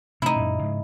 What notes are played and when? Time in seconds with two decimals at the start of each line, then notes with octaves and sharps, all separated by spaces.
0.22 C3 A3 D#4 E4
0.36 F#2 A#2
0.59 G#2 C#3